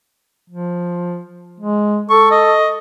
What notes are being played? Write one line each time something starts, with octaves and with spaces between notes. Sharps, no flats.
F3
G#3
A4 C#6
D#5